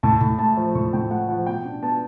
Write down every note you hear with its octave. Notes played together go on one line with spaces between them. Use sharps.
A2 A5
A2
A3 A5
F3
A2 C#6
A2 G5
A3 F#5
F3 F#5
B2 G5
D4
B3 A5